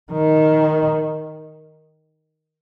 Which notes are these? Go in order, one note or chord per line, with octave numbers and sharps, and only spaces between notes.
D#3